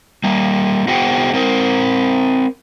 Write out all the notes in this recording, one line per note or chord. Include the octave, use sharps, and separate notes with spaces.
G3 A#3
B3 F#4 G#4 C5 F#5 G5
C4 A#4 C5